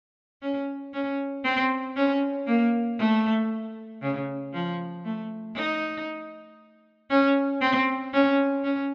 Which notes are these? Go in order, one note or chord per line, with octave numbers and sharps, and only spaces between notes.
C#4
C#4
C4
C#4
A#3
A3
C#3
F3
A3
D#4
C#4
C4
C#4
C#4